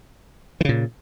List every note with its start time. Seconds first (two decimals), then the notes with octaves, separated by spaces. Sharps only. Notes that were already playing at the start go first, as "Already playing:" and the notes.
0.61 E3
0.65 C#3
0.69 A#2